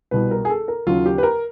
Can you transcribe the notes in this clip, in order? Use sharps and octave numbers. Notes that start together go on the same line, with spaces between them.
C2 B2 G3 B4
A#4
G#4
A4
A#4
D#2 C#3 F#3 F4
G4
B4
A#4